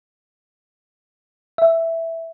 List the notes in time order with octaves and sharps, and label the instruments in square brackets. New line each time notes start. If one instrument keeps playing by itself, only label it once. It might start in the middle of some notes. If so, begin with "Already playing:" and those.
[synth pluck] E5